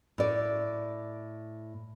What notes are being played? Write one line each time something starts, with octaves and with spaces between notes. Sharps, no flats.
A2 D5